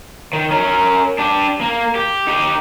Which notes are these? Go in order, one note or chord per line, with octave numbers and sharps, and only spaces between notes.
D#3
C#4 A#4
D4 G4
A#3
G4
D#4 G4